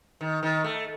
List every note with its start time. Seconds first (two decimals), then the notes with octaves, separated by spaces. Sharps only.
0.21 D#3
0.43 D#3
0.64 A3